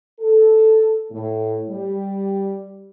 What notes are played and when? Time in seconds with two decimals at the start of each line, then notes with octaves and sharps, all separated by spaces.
0.20 A4
1.10 A2
1.69 G3